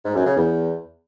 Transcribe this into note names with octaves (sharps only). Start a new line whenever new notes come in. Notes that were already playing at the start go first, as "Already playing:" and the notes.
G#2
F#2
C#3
E2